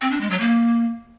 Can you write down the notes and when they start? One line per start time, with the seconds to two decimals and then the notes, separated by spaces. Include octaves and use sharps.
0.02 C4
0.11 D4
0.21 G#3
0.30 F#3
0.40 A#3